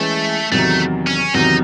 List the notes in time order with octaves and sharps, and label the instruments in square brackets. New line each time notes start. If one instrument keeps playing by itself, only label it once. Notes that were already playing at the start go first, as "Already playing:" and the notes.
Already playing: [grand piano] E3 G#3 C#4 E4 [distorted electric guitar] A3
[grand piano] E2 C3 D#3 F#3 [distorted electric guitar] A3
[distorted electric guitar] C#4
[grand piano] E2 C3 D#3 F#3 [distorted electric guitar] D#4